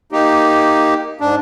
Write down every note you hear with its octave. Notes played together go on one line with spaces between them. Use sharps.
A#3 D#4 G4
G#2 D4